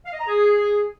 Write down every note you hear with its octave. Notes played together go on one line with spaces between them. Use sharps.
F5
D#5
A#5
G#4